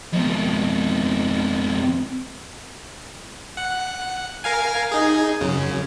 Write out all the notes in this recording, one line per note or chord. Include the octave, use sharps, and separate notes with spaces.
F2 B2
F#5
A#4 F5 G#5
D#4 G#4
F#2 C#3